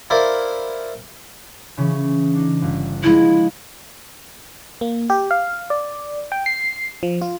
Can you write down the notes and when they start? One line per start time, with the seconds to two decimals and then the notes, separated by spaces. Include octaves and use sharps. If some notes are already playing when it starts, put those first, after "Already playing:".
0.10 E4 A#4 C5 D5 F5 B5
1.77 C#3 E3 C#4
2.34 D4 D#4
2.62 G1
3.03 F3 G#3 E4 D#5
4.81 A#3
5.10 G4
5.31 F5
5.70 D5
6.32 G5
6.46 C7
7.03 F3
7.22 F4